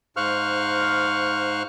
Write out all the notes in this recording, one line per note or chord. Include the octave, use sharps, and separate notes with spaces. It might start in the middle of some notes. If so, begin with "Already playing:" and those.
G#2 C5 F5 C#6 F6 F#6